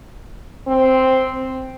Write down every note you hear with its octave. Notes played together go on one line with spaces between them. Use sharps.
C4